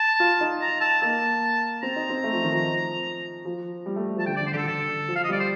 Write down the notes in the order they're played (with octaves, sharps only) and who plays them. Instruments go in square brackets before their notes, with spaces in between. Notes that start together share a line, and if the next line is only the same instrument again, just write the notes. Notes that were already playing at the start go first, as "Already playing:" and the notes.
Already playing: [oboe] A5
[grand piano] F4
D#4
[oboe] A#5
A5
[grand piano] A#3 [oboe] A5
[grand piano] C4 [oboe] A#5
[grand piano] D#4
C4
A3
F3
D#3
F3
F3
G3
A3
G3
F3
[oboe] A5
[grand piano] D3 [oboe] G5
[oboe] D5
[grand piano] D3
[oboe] C5
[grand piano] D3 [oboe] G4 A4
[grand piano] D3 [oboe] A4
[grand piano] F3
[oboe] F5
D#5
[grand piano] G3 [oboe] D5
[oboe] C5